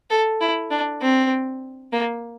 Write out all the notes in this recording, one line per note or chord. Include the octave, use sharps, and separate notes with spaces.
A4
E4
D4
C4
A#3